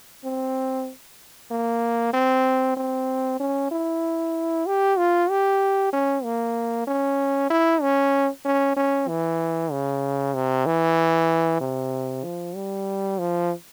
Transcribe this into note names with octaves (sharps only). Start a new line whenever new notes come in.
C4
A#3
C4
C4
C#4
E4
G4
F4
G4
C#4
A#3
C#4
E4
C#4
C#4
C#4
E3
C#3
C3
E3
C3
F3
G3
F3